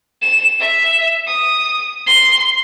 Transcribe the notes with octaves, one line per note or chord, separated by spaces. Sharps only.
E7
E5
D#6
C6